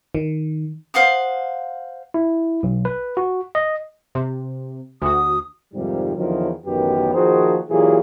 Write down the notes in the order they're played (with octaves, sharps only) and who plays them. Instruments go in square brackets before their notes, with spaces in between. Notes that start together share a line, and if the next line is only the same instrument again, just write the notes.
[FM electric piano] D#3
[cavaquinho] C5 F5 F#5 D#6
[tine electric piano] E4
B1
B4
F#4
D#5
[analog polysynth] C3
[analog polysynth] D2 F#4 [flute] D#6
[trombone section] F2 G#2 C3 D#3 G3
E2 D3 D#3 F3 F#3
A1 F#2 D#3 B3 G4 B4
A#2 D#3 F3 F#4 G#4 C5
A#2 E3 F#3 G4 G#4